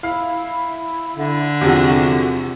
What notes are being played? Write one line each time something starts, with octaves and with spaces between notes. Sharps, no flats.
E4 F5
D3
E2 C3 F3 F#4